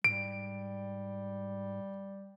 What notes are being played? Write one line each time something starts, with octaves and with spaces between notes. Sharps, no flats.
G#2 G3 D7